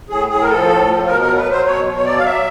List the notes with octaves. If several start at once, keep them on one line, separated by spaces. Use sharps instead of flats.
A2 G#4
A2 G#4
A#4
F3 A4
A2
F3
B2 A#4
F#3 A#4
B4
F#3 C5
B2 C#5
B2
C#5
F#3 D5
F5
F#3 E5